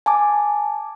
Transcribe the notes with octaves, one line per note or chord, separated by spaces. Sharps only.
G#5 A5 D6